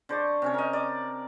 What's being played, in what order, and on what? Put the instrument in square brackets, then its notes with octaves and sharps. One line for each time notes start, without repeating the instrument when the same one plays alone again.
[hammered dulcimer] D3 C5 D5 C#6
C3 C#4 C#5
A#4 D#5
D5